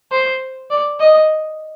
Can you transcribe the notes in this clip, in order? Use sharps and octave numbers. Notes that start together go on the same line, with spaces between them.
C5
D5
D#5